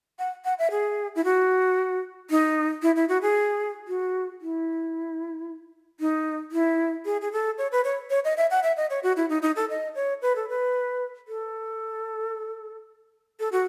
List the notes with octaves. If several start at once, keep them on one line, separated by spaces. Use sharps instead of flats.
F#5
F#5
E5
G#4
E4
F#4
D#4
E4
E4
F#4
G#4
F#4
E4
D#4
E4
G#4
G#4
A4
C#5
B4
C#5
C#5
D#5
E5
F#5
E5
D#5
C#5
F#4
E4
D#4
D#4
A4
D#5
C#5
B4
A4
B4
A4
A4
F#4